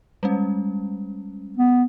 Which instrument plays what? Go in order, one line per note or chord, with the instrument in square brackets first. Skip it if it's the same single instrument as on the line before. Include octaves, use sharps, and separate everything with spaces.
[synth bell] G3 G#3 C#4
[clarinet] B3